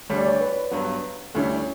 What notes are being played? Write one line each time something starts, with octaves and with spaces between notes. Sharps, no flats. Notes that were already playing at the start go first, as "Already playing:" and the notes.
D2 D3 G3 D4 C#5
D5
C#5
B4
G2 F#3 B3
D2 D3 G3 C#4 E4 A4
C#5